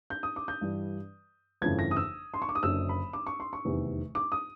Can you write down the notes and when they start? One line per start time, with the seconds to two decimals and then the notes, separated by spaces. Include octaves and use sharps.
0.10 G6
0.23 D#6
0.36 D6
0.48 G6
0.61 G2 E3 G3
1.62 G1 F2 C#3 E3 A3 G#6
1.79 A#6
1.91 D#6
1.96 E6
2.34 C6
2.42 C#6
2.49 D6
2.55 D#6
2.63 F#1 F#2 D3 E6
2.89 B5
3.13 D6
3.27 C#6
3.40 C6
3.53 C#6
3.65 F1 E2 C3 D#3
4.15 D6
4.32 D#6